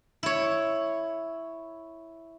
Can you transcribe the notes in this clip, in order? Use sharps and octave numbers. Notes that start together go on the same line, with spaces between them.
E4 C#5